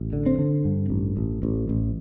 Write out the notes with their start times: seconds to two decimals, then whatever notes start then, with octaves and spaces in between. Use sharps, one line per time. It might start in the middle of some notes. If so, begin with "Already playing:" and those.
Already playing: A1
0.13 D3
0.26 C4
0.38 D3
0.65 G2
0.90 A1
1.17 A1
1.43 A1
1.69 A1